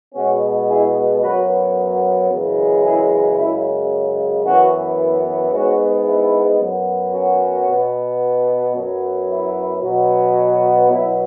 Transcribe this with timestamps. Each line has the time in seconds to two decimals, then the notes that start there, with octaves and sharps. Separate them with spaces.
0.15 B2 G#3 B3 C#4 F#4
0.68 E4 G#4
1.22 F#2 F#3 B3 F#4 B4
2.29 F#2 C#3 E3 G#3
2.83 E4 G#4
3.37 F#2 C#3 G#3 E4
4.44 F#2 E3 B3 C#4 F#4
4.98 E4
5.52 G#2 G#3 B3 C#4 F#4
6.05 E4
6.59 F#2 F#3 B3
7.13 C#4 F#4
7.67 B2 B3
8.74 F#2 F#3 B3
9.28 E4
9.82 B2 F#3 B3
10.90 B2 F#3 B3 E4